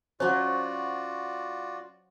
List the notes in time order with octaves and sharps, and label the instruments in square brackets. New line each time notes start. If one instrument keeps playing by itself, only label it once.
[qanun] F#3 C#4 [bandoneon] F4 F#4 D5 [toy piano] C5